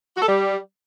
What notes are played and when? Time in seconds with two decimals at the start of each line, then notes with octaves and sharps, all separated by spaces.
0.15 F#4
0.21 A4
0.26 G3